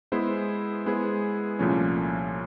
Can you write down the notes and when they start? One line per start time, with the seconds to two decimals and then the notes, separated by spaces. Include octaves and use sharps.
0.12 G#3 B3 E4 G#4 C5
0.86 G#3 B3 E4 G#4 C5
1.59 C2 A#2 F3 A3 C#4